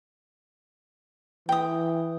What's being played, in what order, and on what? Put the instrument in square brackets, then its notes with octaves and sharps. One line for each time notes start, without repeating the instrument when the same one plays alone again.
[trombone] E3 [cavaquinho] G5 D#6